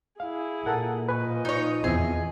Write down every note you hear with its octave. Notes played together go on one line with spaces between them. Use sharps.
E4 G#4 F5
A#2 A4 A#4 F#5
F3 B4 D#5 G#5 C#6
D#4 C#5
E2 C4 E4 G#4 E5